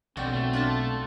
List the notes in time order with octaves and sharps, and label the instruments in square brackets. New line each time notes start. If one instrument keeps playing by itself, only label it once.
[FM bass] B1 [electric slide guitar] D3 D5 G5 [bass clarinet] C4 [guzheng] F#4
[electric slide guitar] A3
[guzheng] D4 F4 A5